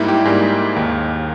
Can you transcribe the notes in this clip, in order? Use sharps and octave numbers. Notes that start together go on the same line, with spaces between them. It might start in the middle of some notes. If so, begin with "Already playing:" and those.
Already playing: G#2 G3 A#3 D#4 E4
G4
G#2 G3 A#3 G#4
D#2 D#3 A#3